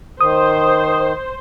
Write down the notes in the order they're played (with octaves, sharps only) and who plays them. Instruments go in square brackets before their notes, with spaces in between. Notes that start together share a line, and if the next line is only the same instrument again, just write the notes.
[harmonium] D#3 [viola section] C5 [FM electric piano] D#6